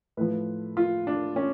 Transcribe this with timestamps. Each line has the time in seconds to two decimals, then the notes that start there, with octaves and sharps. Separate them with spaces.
0.17 A2 F3 B4
0.77 F4
1.07 D4
1.36 C#4